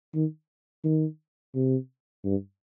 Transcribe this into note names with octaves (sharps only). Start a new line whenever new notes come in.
D#3
D#3
C3
G2